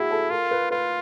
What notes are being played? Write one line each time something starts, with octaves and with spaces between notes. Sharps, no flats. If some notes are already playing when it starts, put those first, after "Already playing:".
Already playing: E4 F#4 G#4
A4
F4 A#4
B4
F4 B4